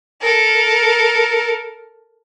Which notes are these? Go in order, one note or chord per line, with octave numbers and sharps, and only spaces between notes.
A4 A#4